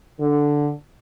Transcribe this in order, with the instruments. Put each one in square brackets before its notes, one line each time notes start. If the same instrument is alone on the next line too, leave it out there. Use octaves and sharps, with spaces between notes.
[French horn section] D3